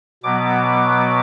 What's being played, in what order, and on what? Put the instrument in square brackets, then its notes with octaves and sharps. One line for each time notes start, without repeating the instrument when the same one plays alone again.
[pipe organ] B2 F#3 B3 D6